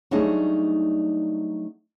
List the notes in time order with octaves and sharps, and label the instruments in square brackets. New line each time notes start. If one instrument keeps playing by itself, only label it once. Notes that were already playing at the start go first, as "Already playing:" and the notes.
[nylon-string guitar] F#3 G3 A3 D4 D#4 G#4